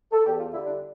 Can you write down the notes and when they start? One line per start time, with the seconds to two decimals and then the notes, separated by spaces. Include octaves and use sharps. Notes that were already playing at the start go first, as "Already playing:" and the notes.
0.12 A4
0.26 E2 G4
0.40 F4
0.53 D3 E4
0.56 G3
0.66 D4